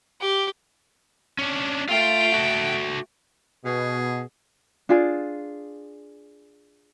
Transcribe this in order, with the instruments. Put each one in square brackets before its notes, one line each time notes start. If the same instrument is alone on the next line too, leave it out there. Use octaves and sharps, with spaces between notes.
[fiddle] G4
[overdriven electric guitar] C#4 D4
[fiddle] A3 G5 [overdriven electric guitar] F4 F5
[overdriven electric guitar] F#4 A4
[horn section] B2 [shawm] G#4
[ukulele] D4 F4 G#4